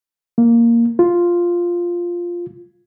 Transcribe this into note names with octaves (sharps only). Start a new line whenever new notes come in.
A#3
F4